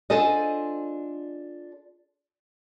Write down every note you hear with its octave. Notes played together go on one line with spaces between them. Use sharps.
D4 F4 G#4 A4 C5 D#5